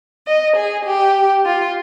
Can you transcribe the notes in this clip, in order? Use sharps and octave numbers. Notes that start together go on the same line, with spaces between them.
D#5
G#4
G4
F4